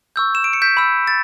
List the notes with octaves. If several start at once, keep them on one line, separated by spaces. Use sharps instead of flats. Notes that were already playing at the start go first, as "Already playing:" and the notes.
C#6 E6 G6
E7
D7
C#7
G6 B6
B5 E6 G6
A6